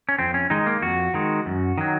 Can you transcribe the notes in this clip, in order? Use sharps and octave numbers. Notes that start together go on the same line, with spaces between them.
C#4
F2 C4
C#4
D#3 G#3 D#4
A#3
F2 F#4
D#3 G#3
F#2
D#3 F#3